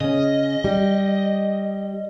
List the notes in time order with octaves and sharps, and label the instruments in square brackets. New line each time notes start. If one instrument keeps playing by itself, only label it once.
[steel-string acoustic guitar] C#3 C#4 [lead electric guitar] D#5
[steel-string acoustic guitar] G3